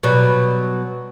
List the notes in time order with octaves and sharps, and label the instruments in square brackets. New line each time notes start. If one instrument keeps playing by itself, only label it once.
[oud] B2 F#3 G3